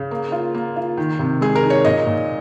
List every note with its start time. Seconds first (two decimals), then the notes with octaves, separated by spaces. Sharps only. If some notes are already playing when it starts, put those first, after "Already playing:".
Already playing: C#3
0.11 A#3
0.32 F4
0.54 A#3
0.76 F4
0.97 D#3
1.19 C3
1.41 G#3 G#4
1.55 A#4
1.63 D#4
1.70 C#5
1.85 A#2 D#5
2.07 A#2